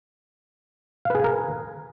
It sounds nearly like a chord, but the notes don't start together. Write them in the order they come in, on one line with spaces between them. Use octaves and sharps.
F5 B4 G#4 G#5 A#4